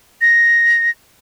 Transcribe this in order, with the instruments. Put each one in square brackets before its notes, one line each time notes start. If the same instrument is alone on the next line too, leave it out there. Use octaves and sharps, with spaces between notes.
[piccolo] A#6